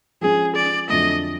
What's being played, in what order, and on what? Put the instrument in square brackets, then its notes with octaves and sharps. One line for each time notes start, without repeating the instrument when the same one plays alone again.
[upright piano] F3 G#3 C#4 [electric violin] G#4
[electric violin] D5
[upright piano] F2 D3 F#3 A3 [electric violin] D#5